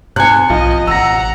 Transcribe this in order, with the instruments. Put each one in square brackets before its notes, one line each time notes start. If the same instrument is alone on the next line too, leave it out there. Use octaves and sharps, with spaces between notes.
[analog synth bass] G#2 [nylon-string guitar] C3 G#5 [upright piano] F#6 C#7
[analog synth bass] B1 [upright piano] F3 F4 [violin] D#5
[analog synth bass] A1 [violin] F#5 A#5 [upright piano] E6 A#6